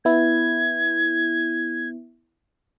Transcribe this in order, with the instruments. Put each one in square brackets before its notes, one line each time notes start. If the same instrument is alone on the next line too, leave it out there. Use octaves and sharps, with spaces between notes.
[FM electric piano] B3 E4 [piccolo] G#6